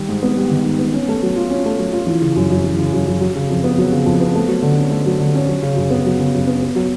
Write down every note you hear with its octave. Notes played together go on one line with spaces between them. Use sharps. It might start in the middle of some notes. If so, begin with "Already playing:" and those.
Already playing: D#3 G3
G#2
B3
G3
D#3
G#2
B3
C#4
A3
F#3
F4
C#4
A3
F#3
F4
E3
C#3
F#2
F#2
E3
C#3
F#2
F#2
F#3
C#3
F2
B3
F#3
C#3
F2
B3
A3
F#3
D3
C#4
A3
F#3
D3
C#4
F#3
C#3
F#2
B3
F#3
C#3
F#2
B3
B3
F#3